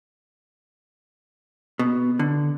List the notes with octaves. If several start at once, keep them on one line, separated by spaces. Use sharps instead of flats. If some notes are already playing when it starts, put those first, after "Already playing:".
B2
D3